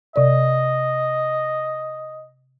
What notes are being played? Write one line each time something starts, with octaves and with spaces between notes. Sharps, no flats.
C3 D5 D#5